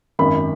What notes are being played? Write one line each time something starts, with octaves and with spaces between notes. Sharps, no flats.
G#1 F#2 D#3 B5